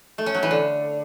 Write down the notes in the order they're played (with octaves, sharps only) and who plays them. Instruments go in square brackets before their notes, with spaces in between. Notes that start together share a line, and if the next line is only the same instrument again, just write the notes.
[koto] A3
C#4
F#3
E3
D3